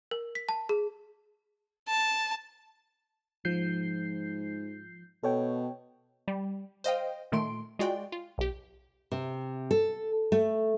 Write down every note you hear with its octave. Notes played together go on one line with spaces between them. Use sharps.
A#4
B6
A5
G#4
A5
G#2 F3 G6 C7
B2 A4 C#5 G5
G3
C5 D#5 F5 G5
A#2 D#3 A3 C6 D7
G#3 F4 F#4 D5 G5
F4
B1 G4
C3
A4
A3